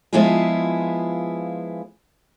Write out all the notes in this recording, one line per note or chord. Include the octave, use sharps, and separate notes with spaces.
F3 G#3 B3 E4 F4 G#4